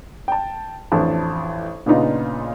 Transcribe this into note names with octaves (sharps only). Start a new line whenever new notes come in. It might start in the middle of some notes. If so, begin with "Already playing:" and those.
G5 A5
A1 F2 E3 D4 A5
A#2 C#3 B3 D4 D#4 F4